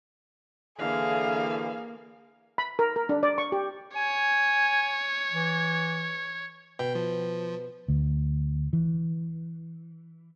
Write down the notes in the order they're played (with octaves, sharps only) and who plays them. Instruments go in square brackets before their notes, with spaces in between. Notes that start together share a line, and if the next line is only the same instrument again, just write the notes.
[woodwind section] D3 E3 [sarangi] A#3 [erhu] G#4 [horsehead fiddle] F5
[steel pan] B5
A#4
A#4
D4
D5
C#6
G4
[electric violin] C#5 [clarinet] G#5
[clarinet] E3
[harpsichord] B2 [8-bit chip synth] G5
[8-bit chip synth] F3
[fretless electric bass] D2
E3